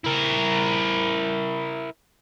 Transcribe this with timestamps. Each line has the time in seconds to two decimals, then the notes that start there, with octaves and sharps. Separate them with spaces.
0.04 E4 A#4